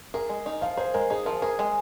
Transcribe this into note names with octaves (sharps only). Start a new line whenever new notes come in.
G#4 A#4
G#3
D#4
F3 F5
G#4 C5
G#3 A#4
D#4 G#4
F3 A#4
G#4 A#4
G#3